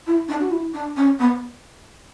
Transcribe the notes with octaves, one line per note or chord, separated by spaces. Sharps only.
E4
D4
F#4
E4
D4
C#4
B3